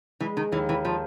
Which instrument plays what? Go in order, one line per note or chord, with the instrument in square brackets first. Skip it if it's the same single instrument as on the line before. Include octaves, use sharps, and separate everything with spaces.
[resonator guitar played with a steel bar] E3 [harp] G#3
[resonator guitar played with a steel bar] D#3
[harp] D#2 [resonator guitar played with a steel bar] E3
[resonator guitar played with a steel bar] E3
[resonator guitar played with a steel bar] F3 [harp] G#3